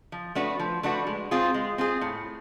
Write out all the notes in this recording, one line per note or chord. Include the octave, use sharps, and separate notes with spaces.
F3
A3 D4 F#4 B4
F3
A3 D4 F#4 B4
G#3
C4 F4 G#4
G#3
C4 F4 G#4
A2